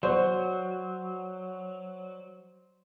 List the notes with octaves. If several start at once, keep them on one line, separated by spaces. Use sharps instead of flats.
F#3 C5 D5 F#5 C#6